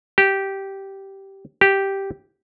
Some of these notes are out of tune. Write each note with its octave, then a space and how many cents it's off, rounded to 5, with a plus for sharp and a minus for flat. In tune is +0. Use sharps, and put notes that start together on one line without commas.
G4 -10
G4 -5